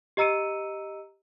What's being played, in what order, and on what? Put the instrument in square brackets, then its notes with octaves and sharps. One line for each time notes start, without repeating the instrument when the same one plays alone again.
[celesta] G4 D#5 A#5 E6 C#7 D#7